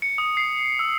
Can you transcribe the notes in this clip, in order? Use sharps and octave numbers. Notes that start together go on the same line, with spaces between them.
C#7
D#6
C7
E6